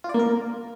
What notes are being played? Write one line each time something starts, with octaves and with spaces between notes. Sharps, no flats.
F4
D5
A#3
A#4